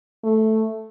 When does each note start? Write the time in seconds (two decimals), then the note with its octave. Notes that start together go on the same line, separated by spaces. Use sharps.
0.24 A3